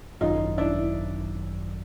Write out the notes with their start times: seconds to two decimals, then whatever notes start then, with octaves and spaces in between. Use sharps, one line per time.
0.21 G#1 F#2 D#3 F#3 D#4 F4
0.58 D4 E4